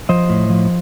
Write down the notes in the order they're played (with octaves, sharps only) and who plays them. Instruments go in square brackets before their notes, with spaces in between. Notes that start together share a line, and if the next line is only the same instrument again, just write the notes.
[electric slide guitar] F3 C5 D#5
A2
F3